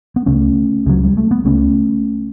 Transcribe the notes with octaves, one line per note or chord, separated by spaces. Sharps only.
B3
C#2 C#3 A3 C#4
C#2 C#3 F#3
G3
A3
B3
C#2 C#3 A3 C#4